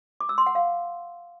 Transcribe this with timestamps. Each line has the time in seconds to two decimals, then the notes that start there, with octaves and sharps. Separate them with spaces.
0.20 D6
0.29 E6
0.38 C6
0.46 F#5
0.55 F5